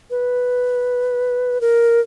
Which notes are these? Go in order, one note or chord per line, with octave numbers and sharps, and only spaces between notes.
B4
A#4